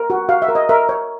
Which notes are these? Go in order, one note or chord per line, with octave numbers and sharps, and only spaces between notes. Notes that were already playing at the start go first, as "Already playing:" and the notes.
Already playing: A#4
F#4
F#4 F5
E5
A#4
D#5
A#4 E5
C#5